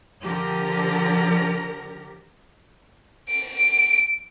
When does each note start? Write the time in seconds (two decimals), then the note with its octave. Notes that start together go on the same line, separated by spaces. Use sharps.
0.22 D3 F3 G4 A#4
3.31 D7